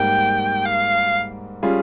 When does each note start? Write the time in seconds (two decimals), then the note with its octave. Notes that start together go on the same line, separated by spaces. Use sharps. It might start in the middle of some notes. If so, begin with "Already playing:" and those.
Already playing: G#2 G3 A#3 G5
0.65 F5
1.63 G3 C#4 F4 G#4